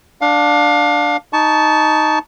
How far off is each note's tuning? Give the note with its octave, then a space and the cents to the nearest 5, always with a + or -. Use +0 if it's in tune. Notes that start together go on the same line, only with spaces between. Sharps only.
D4 +0 F5 +25
D#4 +0 A5 -10 C#6 +25